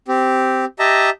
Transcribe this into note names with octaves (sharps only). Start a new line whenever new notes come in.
C4 G4
G4 D#5 E5 A5 A#5